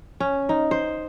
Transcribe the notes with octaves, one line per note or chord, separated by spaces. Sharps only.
C#4
D#4
C5